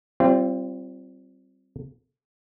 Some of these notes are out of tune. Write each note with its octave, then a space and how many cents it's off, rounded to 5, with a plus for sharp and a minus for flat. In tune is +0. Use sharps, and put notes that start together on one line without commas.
G3 -25 C4 +5 F4 -35